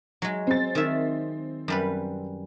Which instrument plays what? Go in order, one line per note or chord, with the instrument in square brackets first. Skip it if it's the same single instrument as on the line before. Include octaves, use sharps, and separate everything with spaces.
[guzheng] F#3 G#3
[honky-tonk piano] C4 A6
[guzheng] D#3 E5
F#2 G3 B4